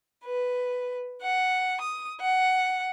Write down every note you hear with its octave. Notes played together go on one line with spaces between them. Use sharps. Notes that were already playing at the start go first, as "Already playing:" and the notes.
B4
F#5
D#6
F#5